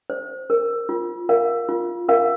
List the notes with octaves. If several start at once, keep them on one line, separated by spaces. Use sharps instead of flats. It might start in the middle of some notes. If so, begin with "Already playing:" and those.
C5
A#4
F4
A#4 F5
F4
A#4 F5